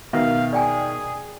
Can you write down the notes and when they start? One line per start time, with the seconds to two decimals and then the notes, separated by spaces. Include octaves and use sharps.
0.13 B2 D#3 E5 F5
0.53 G#4 D5 G5 G#5